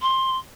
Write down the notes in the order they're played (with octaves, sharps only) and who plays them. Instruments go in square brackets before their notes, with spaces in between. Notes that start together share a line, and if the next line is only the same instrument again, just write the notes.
[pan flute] C6